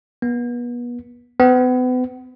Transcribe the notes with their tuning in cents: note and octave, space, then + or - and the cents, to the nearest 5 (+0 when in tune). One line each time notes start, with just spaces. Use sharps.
B3 -35
B3 +35